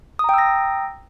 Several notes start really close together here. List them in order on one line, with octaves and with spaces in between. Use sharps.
D#6 A#5 G5 E6 A#6